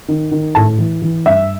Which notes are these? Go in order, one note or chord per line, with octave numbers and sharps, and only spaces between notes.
D#3
D#3
A2 A5
E3
E3
G2 E5